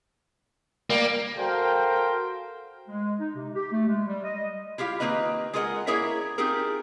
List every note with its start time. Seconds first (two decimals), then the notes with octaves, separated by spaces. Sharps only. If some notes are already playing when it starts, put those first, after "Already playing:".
0.90 G3 A#3
1.38 F#4 A4 A#4 C5 F5 G5
2.88 G#3
3.19 D#4
3.35 C3
3.54 G4
3.72 A3
3.87 G#3
4.06 G3
4.24 D#5
4.78 E4 F4 G4 F5
5.00 D#3 A#3 C4 B4 D#5
5.53 G#3 F4 G#4 A#4 D#5 F#5
5.87 A#3 E4 G#4 A#4 C#5 E5
6.38 C4 D#4 F4 G4 G#4 A#4